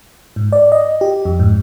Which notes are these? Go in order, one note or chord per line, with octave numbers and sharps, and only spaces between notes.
G#2
D5
D#5
G4
F2
G#2